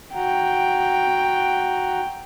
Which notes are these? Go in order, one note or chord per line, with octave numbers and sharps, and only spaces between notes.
F#4 F#5 G5 A#5